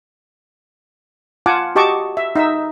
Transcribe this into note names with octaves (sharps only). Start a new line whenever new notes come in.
F4 F#5 G#5 A5 D6
F#4 G4 D#5 A5 C#6 D6
E5
D#4 E5 E6